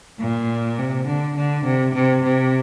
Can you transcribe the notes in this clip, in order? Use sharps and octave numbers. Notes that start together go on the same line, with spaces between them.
A#2
C3
D3
D3
C3
C3
C3